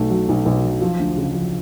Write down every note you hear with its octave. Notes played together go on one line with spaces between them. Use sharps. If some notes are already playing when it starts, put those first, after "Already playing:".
Already playing: B1 A3
F#3
B1
B1
F#3
F3
D2
C#3
F3